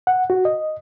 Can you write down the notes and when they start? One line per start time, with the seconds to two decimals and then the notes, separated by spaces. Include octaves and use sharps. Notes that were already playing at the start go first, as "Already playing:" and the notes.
0.07 F#5
0.30 F#4
0.45 D#5